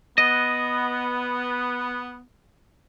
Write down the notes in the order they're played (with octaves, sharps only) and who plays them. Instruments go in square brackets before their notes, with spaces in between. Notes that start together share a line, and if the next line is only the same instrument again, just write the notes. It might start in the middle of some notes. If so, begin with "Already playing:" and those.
[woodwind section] B3 [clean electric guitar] D#5